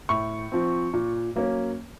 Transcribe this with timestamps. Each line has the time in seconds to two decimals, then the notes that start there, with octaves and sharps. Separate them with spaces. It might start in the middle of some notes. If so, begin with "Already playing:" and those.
0.09 A2 C#6
0.52 F3 C4
0.94 A#2
1.36 F#3 A#3 C#4